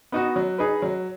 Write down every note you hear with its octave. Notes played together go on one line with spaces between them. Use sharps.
B3 D#4 F#4
F#3
D#4 G#4 B4
F#3